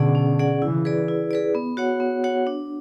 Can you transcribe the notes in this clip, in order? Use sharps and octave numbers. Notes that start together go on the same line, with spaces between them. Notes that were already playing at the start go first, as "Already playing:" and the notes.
Already playing: B2 D3 C#4 G#4 D5 F#5
C#4
G#4 D5 F#5
C#3 E3 E4
G#4 B4 D5
E4
G#4 B4 D5
B3
F#4 C#5 F#5
B3
F#4 C#5 F#5
D4